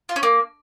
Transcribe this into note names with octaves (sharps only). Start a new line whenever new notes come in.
F4
C#4
A#3